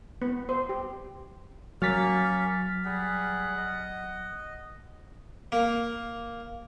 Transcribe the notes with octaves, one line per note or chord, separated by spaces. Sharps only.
B3
C5
G4
F#3 A#3 C#4 C#6 F6 A6 B6
G3 G#4 F#5
D#5
A#3